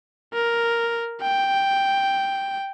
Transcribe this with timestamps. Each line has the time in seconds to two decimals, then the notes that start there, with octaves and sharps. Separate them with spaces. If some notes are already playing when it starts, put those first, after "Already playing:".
0.34 A#4
1.22 G5